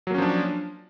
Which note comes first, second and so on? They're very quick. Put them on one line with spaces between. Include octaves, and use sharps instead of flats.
F#3 A#3 C#4 F3 D4